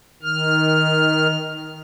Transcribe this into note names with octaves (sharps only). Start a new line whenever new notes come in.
D#3 F6